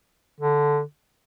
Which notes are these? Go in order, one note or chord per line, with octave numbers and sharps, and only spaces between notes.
D3